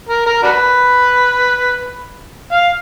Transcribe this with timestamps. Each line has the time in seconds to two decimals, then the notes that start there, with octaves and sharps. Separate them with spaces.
0.09 A#4
0.26 A#4
0.43 D4 F#4 B4
2.52 F5